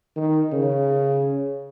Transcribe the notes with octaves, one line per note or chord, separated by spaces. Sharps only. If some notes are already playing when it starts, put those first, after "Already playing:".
D#3
C#3